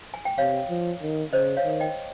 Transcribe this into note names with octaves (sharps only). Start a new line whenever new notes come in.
G#5
G5
C3 C#5 F5
F3
D#3
C#3 C5 D#5
C#5 F5
D#3
D#5 G5